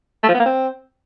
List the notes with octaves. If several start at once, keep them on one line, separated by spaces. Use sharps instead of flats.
A3
F3
B3
A#3
C4